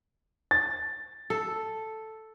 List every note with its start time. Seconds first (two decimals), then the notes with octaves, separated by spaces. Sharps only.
0.51 A6
1.30 A4